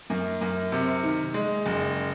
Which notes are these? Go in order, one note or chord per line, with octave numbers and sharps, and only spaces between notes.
F#2
F#2
C3
D#3
G#3
F#1